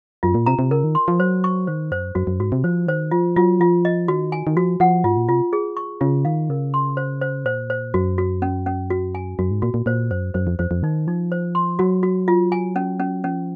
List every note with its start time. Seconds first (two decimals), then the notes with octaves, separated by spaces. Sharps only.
0.23 F#2 F4
0.34 A#2
0.46 C3 A#5
0.59 C3
0.71 C#3 A#4
0.84 D#3
0.95 C6
1.08 F3
1.20 F#3 C5
1.44 C#6
1.67 D#3 C5
1.92 F#2 C5
2.15 F#2 F#4
2.27 F#2
2.39 G#2 F#4
2.52 C3
2.64 F3 C5
2.87 D#3 C5
3.11 F3 F4
3.36 F#3 F4
3.60 F3 F4
3.85 D#5
4.08 D#3 F#4
4.32 G#5
4.47 D#3
4.56 F3 F#4
4.80 F3 F#5
5.04 G#2 F4
5.17 A#2
5.29 C3 F4
5.53 G#4
5.77 C#6
6.01 C#3 F4
6.25 D#3 F5
6.49 C#3 A#4
6.74 C6
6.97 C5
7.21 C5
7.45 A#2 C5
7.70 C5
7.94 F#2 F#4
8.18 F#4
8.42 C#4
8.66 C#4
8.90 F#4
9.15 G#5
9.39 F#2 F#4
9.51 G#2
9.62 A#2 F#4
9.74 A#2
9.86 A#2 C5
10.11 F#2 C5
10.34 F#2 C5
10.47 F2
10.59 F2 C5
10.71 F2
10.83 D#3 D#4
11.07 F3 D#4
11.32 C5
11.55 C6
11.79 F#3 F#4
12.03 F#4
12.28 F4
12.52 G#5
12.76 C#4
13.00 C#4
13.24 F3 C#4